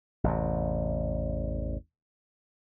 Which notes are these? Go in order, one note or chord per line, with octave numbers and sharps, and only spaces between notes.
A1 E2 C3